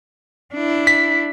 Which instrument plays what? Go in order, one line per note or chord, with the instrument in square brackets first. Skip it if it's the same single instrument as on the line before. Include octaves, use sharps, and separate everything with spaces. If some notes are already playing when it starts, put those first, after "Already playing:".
[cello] D4 E4
[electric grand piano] B6